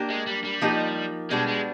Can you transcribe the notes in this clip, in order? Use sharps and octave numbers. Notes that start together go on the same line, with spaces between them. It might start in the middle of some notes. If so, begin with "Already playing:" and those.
Already playing: A#3 D4 G4
G#3
G3
G3
F3 A#3 D#4 G4
B2 G3 G#3 B3 D4
G#3